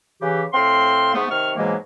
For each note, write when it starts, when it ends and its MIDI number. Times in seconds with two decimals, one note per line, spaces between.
0.21 0.43 49
0.21 0.43 52
0.21 0.43 67
0.53 1.13 45
0.53 1.13 60
0.53 1.13 77
0.53 1.13 84
1.15 1.26 44
1.15 1.26 57
1.15 1.26 59
1.30 1.52 48
1.30 1.52 51
1.30 1.52 85
1.30 1.52 89
1.57 1.74 44
1.57 1.74 47
1.57 1.74 52
1.57 1.74 54
1.57 1.74 56
1.57 1.74 58